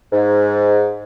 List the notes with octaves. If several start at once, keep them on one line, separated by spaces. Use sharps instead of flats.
G#2